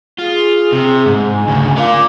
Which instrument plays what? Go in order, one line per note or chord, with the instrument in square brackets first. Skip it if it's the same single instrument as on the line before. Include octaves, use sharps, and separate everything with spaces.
[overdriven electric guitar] F4 [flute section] G#4
[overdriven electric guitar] C3
G#2
[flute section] G#5
[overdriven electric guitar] D2 C#3
[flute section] F4 F5 D6 [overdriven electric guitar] A#4 D5